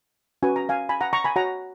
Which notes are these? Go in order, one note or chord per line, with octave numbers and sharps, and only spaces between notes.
C#4 F#4 B4 G#5
A#5
F5 G#5
G#5 B5
F#5 A#5
A#5 C#6
G#5 B5
F#4 C#5 F#5 A#5